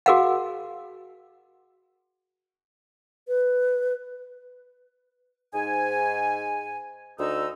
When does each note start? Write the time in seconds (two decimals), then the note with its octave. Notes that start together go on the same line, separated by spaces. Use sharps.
0.06 F#4 G#4 A#4 F5 F#5
3.28 B4
5.53 G#2 G#5
7.19 D2 D#4 E6